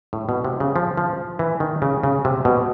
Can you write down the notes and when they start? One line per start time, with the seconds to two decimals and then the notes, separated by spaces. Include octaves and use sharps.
0.13 A2
0.29 B2
0.45 C3
0.60 C#3
0.76 F3
0.97 F3
1.39 E3
1.60 D#3
1.82 C#3
2.03 C#3
2.25 C3
2.45 B2